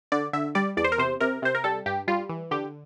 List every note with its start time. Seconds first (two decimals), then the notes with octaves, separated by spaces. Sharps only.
0.12 D3 D5
0.33 D3 E5
0.55 G3 D5
0.77 E2 D5
0.84 C5
0.92 A#4
0.98 C3 C5
1.20 C3 A#4
1.42 C3 C5
1.55 A#4
1.64 G3 A4
1.86 G2 G4
2.08 G3 F4
2.29 E3
2.51 D3 G4